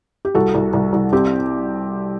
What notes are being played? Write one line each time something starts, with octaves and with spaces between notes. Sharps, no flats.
G4
C2 F#4 A4
C2
C2
C2
C4 G4